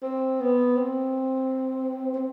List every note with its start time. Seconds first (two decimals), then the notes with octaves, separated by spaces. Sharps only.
0.02 C4
0.40 B3
0.77 C4
2.14 C4